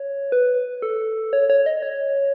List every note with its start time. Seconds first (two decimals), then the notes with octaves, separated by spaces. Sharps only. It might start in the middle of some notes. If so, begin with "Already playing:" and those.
Already playing: C#5
0.32 B4
0.82 A4
1.33 C#5
1.50 C#5
1.66 D#5
1.82 C#5